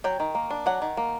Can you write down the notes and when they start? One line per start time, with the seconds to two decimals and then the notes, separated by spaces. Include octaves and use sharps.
0.04 F#3 G5
0.20 D#3
0.35 A#3
0.50 D4
0.66 F#3 F#5
0.82 D#3
0.97 A#3